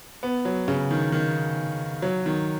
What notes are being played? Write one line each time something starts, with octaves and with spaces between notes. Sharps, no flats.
B3
F#3
C#3
D#3
D#3
F#3
D#3